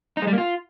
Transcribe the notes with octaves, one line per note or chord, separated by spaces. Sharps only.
D#4
G#3
G3
A#3
F4